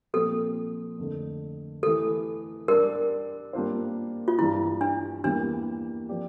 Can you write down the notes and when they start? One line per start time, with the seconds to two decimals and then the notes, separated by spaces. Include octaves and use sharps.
0.14 A#2 F3 C4 A4
0.98 F2 D3 A3
1.83 E3 A3 E4 G4 A4
2.68 G3 D4 G4 A#4 D5
3.53 G3 A#3 D4 F4 C5
4.28 F4
4.39 G2 E3 G3 D4 E4
4.81 D4
5.24 E2 E3 G3 A#3 D4
6.09 F3 C4 G4 D5